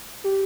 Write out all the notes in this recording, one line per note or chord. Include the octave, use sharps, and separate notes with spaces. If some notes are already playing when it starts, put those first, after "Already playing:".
G4